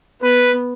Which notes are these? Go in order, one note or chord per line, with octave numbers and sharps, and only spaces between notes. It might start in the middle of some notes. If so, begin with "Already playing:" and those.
B3 B4